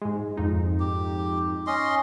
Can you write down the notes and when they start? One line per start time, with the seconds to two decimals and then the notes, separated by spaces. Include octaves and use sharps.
0.02 G#2 G#3
0.37 F2 G#2 D#4
0.80 G4
1.67 C#4 D#5 C6